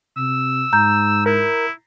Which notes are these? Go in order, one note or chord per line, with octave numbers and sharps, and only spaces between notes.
C3 E6
G#2 A#5 G6
E4 A#4